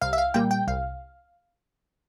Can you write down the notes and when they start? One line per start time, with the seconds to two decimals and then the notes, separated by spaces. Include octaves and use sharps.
0.01 C2 F5
0.13 E5
0.18 F5
0.34 A#2 G3 A#3 G5
0.51 G5
0.67 C2 F5